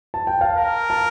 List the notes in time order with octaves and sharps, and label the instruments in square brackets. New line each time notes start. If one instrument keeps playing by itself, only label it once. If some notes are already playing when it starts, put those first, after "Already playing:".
[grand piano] A5
G5
F5 A5
[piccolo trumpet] A#4
[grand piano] A5